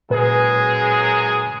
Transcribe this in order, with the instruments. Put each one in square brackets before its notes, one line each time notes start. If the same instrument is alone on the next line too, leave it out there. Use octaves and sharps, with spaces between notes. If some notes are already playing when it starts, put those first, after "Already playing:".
[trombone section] F#2 G#3 G#4 [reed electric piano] A#2 B4